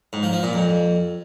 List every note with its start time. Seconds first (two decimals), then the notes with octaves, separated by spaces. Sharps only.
0.13 G#2
0.23 F3
0.33 F3
0.43 A#2
0.53 F2